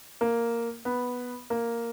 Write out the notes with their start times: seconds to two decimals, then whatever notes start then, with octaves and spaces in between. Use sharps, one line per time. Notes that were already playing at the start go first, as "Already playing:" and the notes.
0.21 A#3
0.85 B3
1.50 A#3